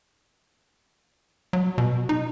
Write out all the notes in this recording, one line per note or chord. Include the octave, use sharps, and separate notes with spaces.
F#3
B2
D#4